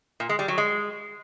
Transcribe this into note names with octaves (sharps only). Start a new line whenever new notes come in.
A#2
G#3
G3
F#3
G#3